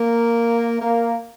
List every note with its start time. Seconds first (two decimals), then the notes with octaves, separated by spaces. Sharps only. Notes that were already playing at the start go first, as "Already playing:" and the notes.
Already playing: A#3
0.81 A#3